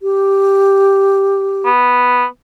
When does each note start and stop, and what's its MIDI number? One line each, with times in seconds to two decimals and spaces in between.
0.02 1.69 67
1.65 2.25 59